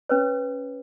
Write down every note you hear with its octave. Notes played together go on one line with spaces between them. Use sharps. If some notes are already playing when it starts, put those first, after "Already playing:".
C#4 B4 C#5